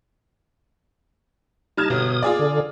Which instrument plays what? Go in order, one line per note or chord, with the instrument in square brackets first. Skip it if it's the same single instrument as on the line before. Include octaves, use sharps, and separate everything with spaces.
[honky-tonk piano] G3 F6 G#6 [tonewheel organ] D#4 A5
[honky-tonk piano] G1 [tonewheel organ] B2 D#6
[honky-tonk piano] F4 G#4 D5
[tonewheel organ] D3